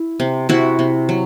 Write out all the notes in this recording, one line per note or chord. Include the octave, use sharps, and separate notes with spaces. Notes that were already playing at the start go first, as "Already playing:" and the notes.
Already playing: E4
C3
C3 E4 F#4
C3
F#3